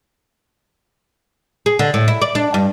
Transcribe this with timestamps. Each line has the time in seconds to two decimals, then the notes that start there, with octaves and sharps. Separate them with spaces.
1.66 G#4
1.79 D3
1.94 A2
2.08 E4
2.22 D5
2.35 D4
2.54 G2